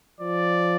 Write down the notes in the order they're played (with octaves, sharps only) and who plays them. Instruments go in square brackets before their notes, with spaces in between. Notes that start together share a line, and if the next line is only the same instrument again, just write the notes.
[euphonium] F3 [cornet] D5